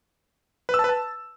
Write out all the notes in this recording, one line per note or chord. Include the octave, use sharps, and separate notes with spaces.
B4
E6
A5
B4
A5